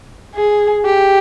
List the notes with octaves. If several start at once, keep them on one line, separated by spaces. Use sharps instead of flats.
G#4
G4